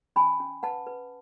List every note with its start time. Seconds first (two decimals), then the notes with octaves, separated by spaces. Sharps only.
0.16 C#4 G#5 B5
0.40 C#4
0.63 B4 F#5 A5
0.86 B4